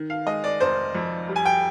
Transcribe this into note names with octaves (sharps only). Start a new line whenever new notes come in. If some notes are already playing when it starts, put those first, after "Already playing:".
Already playing: D#3
F5
G#3 D#5
D5
F1 C5
F2
G3
G#5
G5